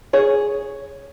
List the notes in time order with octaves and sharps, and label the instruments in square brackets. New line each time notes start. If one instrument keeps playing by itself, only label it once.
[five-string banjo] G#4 C#5